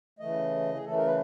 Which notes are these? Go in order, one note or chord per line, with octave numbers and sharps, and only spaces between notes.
C#3 E3 A3 D#5
G#4
C#3 E3 A3 A4
A#4
B4